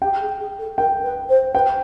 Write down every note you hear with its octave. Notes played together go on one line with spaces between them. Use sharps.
G4 G5
G#4
G#4
A4
A#4 G5
B4
C5
B4 G5